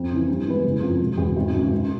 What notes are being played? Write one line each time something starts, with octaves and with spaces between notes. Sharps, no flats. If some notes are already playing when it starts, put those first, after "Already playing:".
Already playing: F2
C#3 E3
G2
E3 G#3 B3
F#1
F2 C#3 F3
E1
E2 B2
G#1
F#2 C#3
E1